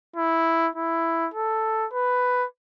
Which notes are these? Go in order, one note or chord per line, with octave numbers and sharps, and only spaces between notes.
E4
E4
A4
B4